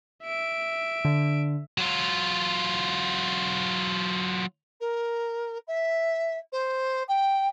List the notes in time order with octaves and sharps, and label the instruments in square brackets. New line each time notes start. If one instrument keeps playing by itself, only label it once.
[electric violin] E5 D7
[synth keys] D3
[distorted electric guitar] F#3 F4
[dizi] A#4
E5
C5
G5